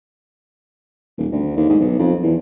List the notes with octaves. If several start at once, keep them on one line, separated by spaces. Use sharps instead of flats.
D#1
D2
D#2
G#2
B1
F2
E2